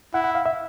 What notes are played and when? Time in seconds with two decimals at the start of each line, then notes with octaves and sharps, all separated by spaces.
0.14 E4 F#5
0.24 F#5
0.35 F5
0.46 E5